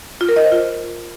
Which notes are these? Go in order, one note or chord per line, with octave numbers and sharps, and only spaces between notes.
F4
A#4
D#5
C5
F4